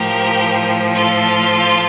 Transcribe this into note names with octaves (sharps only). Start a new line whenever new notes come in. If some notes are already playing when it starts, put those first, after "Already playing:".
Already playing: A2 F3 G4 A#4
F4 A4